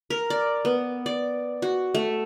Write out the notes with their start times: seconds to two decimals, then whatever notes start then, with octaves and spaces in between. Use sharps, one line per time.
0.10 A#4
0.30 D5
0.65 B3
1.06 D5
1.62 F#4
1.94 A3